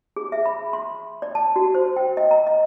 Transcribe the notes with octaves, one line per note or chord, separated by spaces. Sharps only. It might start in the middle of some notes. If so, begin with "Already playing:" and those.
G#4
E5
B5
C6
D5
A5
F#4
C5
G5
D#5
A#5
D#5